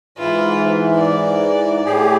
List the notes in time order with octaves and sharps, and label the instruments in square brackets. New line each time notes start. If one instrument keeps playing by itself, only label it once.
[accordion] G#2 E3 [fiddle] E4 F4
[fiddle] D5
[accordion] A2 G4 G#4